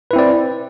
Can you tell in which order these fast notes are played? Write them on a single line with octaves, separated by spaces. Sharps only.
B4 E4 C4 D5